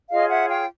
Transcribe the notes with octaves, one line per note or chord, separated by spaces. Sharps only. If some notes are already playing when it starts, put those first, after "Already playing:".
F4 G#4 C#5 D#5 F5
E5 F#5
F5 G5